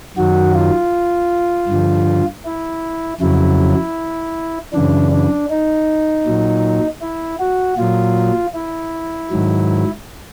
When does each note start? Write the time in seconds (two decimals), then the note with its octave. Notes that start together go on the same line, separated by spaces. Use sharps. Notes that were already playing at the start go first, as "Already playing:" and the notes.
0.17 F#2 D#3 F#3 F#4
0.54 F4
1.68 G2 D3 F3
2.45 E4
3.21 F2 C#3 F#3 E4
4.73 F#2 C#3 E3 D4
5.12 D4
5.50 D#4
6.26 A#2 F#3
7.02 E4
7.40 F#4
7.78 A#2 F#3 F4
8.54 E4
9.31 G#2 D#3 F#3